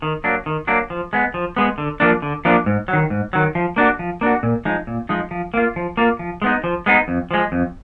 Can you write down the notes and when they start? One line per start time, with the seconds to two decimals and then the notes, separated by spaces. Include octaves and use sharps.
0.02 D#3
0.24 F#3 A#3 D4
0.46 D#3
0.67 F#3 A#3 D4
0.90 F3
1.13 G#3 B3
1.34 F3
1.56 G#3 B3
1.78 D3
2.00 F3 A#3 D4
2.22 D3
2.45 F3 A#3 D4
2.66 G#2
2.88 D#3 F#3
3.10 G#2
3.33 D#3 F#3
3.55 F3
3.76 A#3 D4 F#4
3.99 F3
4.21 A#3 D4 F#4
4.43 A#2
4.65 F3 G#3 D#4
4.87 A#2
5.09 F3 G#3 D#4
5.31 F3
5.54 A#3 F4
5.76 F3
5.97 A#3 F4
6.19 F3
6.42 G#3 B3 D#4
6.64 F3
6.86 G#3 B3 D#4
7.08 F2
7.31 F3 G#3
7.52 F2